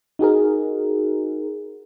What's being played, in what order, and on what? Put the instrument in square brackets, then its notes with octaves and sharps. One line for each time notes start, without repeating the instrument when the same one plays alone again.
[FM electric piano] D#4 F#4 G#4 A#4